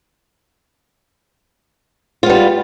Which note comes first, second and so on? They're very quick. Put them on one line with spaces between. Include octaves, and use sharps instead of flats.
F4 B3 G3